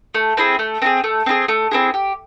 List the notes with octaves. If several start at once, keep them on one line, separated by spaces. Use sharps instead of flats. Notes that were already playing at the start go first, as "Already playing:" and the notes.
A3
C4 E4 G#4
A3
C4 E4 G#4
A3
C4 E4 G#4
A3
C4 E4 G#4
G4